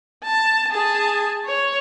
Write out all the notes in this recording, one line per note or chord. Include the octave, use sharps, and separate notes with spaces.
A5
G#4 A5
C#5